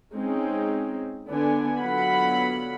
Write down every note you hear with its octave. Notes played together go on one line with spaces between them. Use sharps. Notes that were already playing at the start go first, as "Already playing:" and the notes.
G#3 C4 C#4 D#4
D3 B3 D4 G#5
D3 F#3 B3 F4 F#5 B5